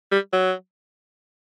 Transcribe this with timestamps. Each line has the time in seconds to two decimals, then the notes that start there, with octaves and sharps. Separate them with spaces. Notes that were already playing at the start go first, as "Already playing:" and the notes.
0.12 G3
0.33 F#3